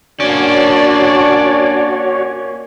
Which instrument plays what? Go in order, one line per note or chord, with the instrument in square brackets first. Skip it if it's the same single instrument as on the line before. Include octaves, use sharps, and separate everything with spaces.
[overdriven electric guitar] A#3 C#4 [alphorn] D4 [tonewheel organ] F#4 C#5 [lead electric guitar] D5